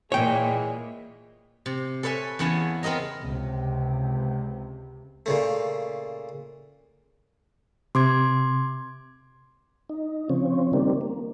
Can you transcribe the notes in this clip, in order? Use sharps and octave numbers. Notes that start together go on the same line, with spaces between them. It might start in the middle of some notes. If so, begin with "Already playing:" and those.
A#2 E3 G#3 G#4 C#5 G5
C3
A4 B4 C#5 E5 G#5
E2 C#3 B3 E4 G#5 A5
B3 C4 A#4 D#5 A#5
C#2 C3
A#2 C#3 A3
C3 C6 D6 G#6
D#4
C#3 F3 C4 C#4
D#3 G3 A#3 C4 D4
A#3